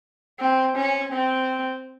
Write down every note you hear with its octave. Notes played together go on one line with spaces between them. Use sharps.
C4
C#4
C4